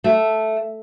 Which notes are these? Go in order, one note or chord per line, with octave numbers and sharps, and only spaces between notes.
A3